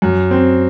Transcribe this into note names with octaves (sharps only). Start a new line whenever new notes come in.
F#2
C4